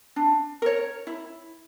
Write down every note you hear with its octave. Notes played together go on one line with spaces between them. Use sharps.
D4
A#4 C#5
E4